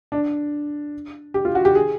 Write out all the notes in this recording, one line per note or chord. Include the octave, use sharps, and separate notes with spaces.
D4
G4
F4
F#4
G4
G#4